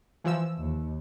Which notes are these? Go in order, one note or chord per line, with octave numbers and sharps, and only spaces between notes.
E3 F3 E6
D#2